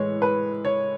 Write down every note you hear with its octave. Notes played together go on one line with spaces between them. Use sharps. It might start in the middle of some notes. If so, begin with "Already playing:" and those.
Already playing: A2 E3 G#3 C#5
B4
C#5